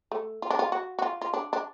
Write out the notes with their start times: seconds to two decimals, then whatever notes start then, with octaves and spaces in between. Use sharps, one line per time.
0.12 A3
0.42 F4
0.50 D4
0.59 F4
0.72 F#4
0.99 F#4
1.02 F4
1.22 F4
1.33 D4
1.53 D4